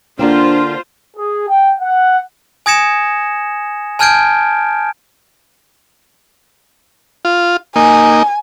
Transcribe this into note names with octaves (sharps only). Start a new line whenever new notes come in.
D3 A#3 C4 D4 F4 C5
G#4
G5
F#5
G#5 D#6 G#6 A#6 C#7 E7
G#5 A5 F6 G6 G#6 D7
F4
A#3 D#4 G#5